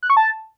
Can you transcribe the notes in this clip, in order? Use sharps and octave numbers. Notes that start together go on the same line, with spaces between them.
F#6
C#6
A5